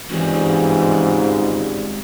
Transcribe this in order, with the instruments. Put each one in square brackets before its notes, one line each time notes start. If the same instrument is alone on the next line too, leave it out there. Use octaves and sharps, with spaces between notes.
[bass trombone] G#2 [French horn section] C#3 G3 F4 [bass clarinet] E3 [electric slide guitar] G#3 C4 F#4